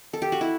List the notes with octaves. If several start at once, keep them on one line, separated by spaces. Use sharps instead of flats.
A4
G4
F#4
E4